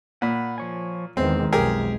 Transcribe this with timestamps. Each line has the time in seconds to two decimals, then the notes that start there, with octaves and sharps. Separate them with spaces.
0.22 A#2 F#5 B5
0.58 F3 C#5 G#5
1.17 E2 D#3 G#3 C4
1.52 B1 F2 G4 G#4 A#4